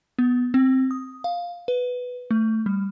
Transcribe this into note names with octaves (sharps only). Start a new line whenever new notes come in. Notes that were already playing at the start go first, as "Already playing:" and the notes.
B3
C4
D#6
F5
B4
A3
G3